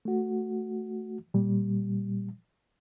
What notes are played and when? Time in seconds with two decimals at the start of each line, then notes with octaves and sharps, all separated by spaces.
0.05 A3 F#4
1.34 A#2 G3